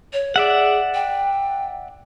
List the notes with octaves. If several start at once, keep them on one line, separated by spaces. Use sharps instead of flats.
C#5
G#4 D5 E5 F#5
G5